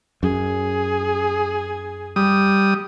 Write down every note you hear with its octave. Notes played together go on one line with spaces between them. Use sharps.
F#2 G#4
G3 D#6